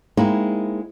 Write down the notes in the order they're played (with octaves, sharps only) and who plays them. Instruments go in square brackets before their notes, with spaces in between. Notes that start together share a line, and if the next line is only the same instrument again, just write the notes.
[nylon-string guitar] G#3 A#3 C4 D#4 E4